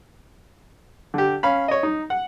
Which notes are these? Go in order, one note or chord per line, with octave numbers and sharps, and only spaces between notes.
D3 G4
C#4 F5 B5
C#5 D#5
D#4
F#5